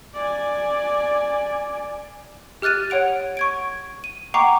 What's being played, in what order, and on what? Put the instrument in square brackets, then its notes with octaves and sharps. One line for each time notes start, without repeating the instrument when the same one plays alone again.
[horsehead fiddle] D5 G#5
[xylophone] G4 F6 F#6 A6 D#7
C#5 F#5 D7 F7
C#6 G#6 D7
D#7
F#5 G5 A#5 C#6 D6 C7